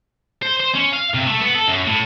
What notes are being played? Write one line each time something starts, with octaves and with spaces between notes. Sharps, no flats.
C5
C5
C#4
F5
C3
A3
B3
A4
F#2
A2